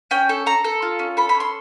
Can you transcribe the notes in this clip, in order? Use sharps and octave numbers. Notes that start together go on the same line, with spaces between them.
C#4 G5
A4
A4 A#5
A4
F4
C#4
A4 B5
B5
C#4
C6